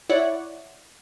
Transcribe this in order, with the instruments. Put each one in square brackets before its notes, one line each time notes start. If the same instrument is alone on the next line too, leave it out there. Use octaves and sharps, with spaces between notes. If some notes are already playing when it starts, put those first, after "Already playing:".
[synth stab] E4 C#5 D5 F#5